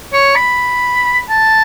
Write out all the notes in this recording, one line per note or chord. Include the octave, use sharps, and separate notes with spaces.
C#5
B5
A5